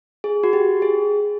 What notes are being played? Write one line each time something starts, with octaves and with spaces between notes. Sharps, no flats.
G#4
F#4
G4
G#4